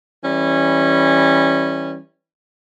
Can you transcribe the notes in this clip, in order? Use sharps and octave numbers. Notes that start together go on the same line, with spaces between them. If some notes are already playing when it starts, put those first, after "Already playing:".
E3 G3 C#4